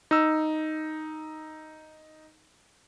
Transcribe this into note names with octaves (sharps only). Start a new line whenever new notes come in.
D#4 E6